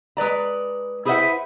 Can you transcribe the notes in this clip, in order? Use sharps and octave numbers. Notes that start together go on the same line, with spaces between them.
G#3 B4 D5 A#5
E4 G#4 B4 C5 E5 F#5